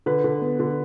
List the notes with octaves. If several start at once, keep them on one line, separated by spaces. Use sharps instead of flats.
D3 B4
D3
B3
D3